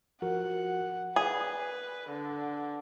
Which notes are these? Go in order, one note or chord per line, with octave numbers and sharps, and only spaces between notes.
F3 F#4 A#4 F#5
G#4 B4 D5 B5
D3